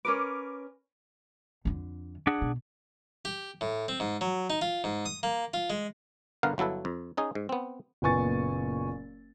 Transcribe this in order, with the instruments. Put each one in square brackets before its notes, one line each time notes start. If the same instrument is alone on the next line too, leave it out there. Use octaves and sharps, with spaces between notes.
[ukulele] C#4 A#4 B4 [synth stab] D6
[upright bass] F2 D3
[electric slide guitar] D4 G#4 F#5
[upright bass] B2
[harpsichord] G4
A2
C4
G#2
F#3
D#4
F4
G#2
D#6
A#3
F4
G#3
[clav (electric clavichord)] G1 D3 B3 A#4 F5 F#5
G1 F#3 E4 A4 B4
F2
C#4 D#4 G#4
G#2
B3 C4
[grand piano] F#1 A#2 B3 G#5 C#6 A6